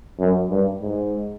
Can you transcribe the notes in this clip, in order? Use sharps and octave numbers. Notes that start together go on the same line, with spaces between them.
F#2
G2
G#2